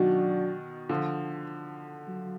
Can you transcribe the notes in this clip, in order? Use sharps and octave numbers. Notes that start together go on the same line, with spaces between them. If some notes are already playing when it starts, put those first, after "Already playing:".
Already playing: B2 D#3 F#3 D4 F#4
D3 F3
F#3